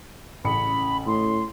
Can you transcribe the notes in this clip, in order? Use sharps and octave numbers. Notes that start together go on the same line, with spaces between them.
A1 C#3 B5 C#7
A2 C6